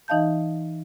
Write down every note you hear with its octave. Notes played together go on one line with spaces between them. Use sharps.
E3 D#4 D#5 F5 A5 G6